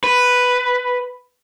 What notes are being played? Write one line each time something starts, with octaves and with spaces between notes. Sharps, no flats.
B4